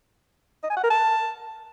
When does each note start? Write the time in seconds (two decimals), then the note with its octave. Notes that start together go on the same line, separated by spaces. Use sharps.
0.63 D#5
0.70 G#5
0.77 F#5
0.83 A#4
0.90 A5